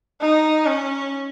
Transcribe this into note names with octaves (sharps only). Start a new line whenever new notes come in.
D#4
C#4